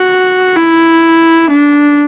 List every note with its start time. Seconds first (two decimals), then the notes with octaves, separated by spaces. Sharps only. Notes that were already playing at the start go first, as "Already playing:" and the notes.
Already playing: F#4
0.56 E4
1.50 D4